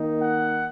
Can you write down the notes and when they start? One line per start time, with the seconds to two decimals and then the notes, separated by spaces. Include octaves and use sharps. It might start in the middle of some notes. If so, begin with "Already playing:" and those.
Already playing: D#3 A#3 D#4
0.21 F#5